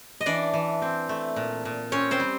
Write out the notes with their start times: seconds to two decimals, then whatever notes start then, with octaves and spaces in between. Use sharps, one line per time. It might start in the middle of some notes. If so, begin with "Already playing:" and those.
0.21 D#5
0.26 E3 D4 D5
0.53 E3
0.82 C4
1.09 A3
1.36 A#2
1.65 A#2
1.92 C4 C#4 C#5
2.11 C4 C5
2.20 G3